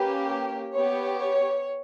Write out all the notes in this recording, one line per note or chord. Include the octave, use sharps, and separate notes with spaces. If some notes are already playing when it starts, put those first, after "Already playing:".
Already playing: A#3 C#4 G4 B4
B3 G4 C#5
C#5